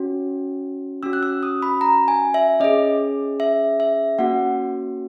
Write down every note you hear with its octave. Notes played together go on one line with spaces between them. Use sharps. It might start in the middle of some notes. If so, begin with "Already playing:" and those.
Already playing: C#4 F#4
C#4 F#4 E6
F#6
E6
D#6
B5
A#5
G#5
E5
C#4 G#4 D#5
E5
E5
A#3 C#4 F#4 F#5